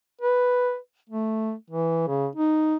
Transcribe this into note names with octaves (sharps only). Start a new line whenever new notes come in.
B4
A3
E3
C#3
D#4